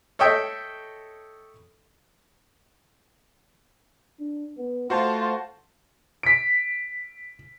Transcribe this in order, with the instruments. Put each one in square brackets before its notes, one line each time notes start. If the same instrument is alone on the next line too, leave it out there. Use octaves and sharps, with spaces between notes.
[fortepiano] A4 C#5 D#5 E5 G5
[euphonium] D4
B3
[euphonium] A3 [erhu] F4 [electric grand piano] F#4 C5 A5
[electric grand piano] B6 D7